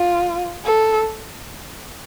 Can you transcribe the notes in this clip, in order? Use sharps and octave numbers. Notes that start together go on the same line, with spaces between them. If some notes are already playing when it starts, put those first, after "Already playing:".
Already playing: F4
A4